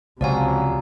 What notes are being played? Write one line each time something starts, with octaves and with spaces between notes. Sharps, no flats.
C#2 C3 F3 F#3 D5 F5 G#5